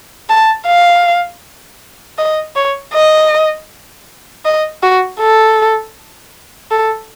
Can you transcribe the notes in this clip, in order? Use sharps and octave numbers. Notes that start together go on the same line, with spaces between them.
A5
F5
D#5
C#5
D#5
D#5
F#4
A4
A4